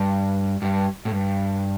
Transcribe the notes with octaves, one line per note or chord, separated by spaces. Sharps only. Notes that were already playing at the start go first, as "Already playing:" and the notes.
Already playing: G2
G2
A2
G2